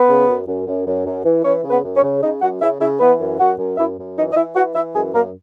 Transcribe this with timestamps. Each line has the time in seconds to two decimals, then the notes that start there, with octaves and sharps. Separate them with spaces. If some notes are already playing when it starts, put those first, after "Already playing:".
Already playing: B3 B4
0.08 C#3
0.27 F#2
0.47 F#2
0.67 F#2
0.86 F#2
1.06 F#2
1.24 E3
1.44 E3 C#4 C#5
1.63 C#3
1.70 B3 B4
1.83 F#2
1.96 C#4 C#5
2.03 C#3
2.22 C#3 D#4 D#5
2.41 F#2 F#4 F#5
2.61 C#3 E4 E5
2.80 C#3 E4 E5
3.00 E3 B3 B4
3.19 F#2
3.39 F#2 F#4 F#5
3.58 F#2
3.77 F#2 E4 E5
3.98 F#2
4.16 E3 D#4 D#5
4.32 D#5
4.36 E3 E4 E5
4.55 E3 F#4 F#5
4.75 E3 E4 E5
4.94 F#2 G#3 G#4
5.14 F#2 A#3 A#4